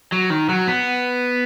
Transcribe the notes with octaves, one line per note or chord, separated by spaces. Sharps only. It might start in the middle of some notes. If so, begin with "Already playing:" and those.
F#3
D#3
F#3
B3